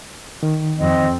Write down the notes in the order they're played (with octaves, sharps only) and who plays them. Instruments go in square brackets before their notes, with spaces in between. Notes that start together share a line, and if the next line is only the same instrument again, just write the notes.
[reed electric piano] D#3
[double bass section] F2 [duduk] C4 [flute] D#5